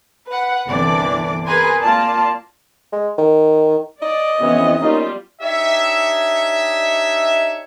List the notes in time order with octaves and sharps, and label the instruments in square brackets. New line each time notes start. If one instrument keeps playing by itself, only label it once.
[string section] B4 F#5
G1 C2 E3 D4 D5 D6
G#4 A#4 B4 G#5 C6
A#3 F4 D5 A5
[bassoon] G#3
D#3
[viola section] D5 [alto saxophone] D#5
[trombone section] F2 C3 E3 [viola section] B3 C#4
[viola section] G3 F4 [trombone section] A#3 C#4 D#4
[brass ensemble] D4 D#4 G4 C#5 D#5 E5